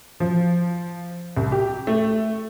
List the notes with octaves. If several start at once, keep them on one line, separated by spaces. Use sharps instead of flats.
F3
C2
G4
A3